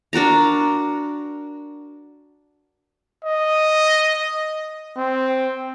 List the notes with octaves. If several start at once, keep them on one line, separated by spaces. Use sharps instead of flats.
D4 F#4 A#4 A#5
D#5
C4